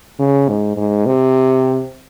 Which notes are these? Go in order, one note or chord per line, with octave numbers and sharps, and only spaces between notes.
C#3
G#2
G#2
C3